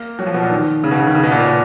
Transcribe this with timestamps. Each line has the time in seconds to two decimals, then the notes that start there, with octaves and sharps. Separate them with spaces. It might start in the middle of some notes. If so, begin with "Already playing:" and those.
Already playing: A#3
0.19 F#3
0.26 F3
0.34 B2
0.43 A#2
0.51 D#3
0.84 C#3
0.91 B2
1.00 C#3
1.07 D#3
1.15 C#3
1.23 B2
1.32 A#2
1.40 B2
1.47 A#2